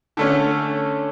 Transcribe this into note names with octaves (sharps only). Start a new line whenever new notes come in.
D3 A3 C#4